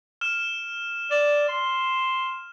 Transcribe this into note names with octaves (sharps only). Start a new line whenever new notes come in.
F6 E7
D5 E7
C6